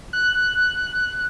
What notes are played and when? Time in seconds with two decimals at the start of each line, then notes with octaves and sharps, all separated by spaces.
0.13 F#6